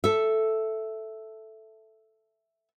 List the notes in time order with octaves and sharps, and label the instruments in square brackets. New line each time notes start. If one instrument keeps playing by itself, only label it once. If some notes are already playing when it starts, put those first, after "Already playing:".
[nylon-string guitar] A4 E5